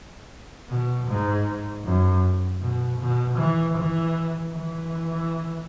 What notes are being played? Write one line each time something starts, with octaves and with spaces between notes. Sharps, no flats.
B2
G#2
F#2
B2
B2
E3
E3
E3